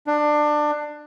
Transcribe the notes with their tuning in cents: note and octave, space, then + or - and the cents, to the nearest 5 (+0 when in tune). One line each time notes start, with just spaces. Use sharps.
D4 +20